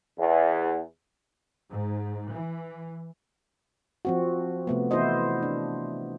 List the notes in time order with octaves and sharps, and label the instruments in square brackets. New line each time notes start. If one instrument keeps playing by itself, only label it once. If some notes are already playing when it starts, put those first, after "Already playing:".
[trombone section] E2
[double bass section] G#2
E3
[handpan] F3 C4 F#4
C3 A3 B3
E3 B3 E4 F#4 C5 D#5
D4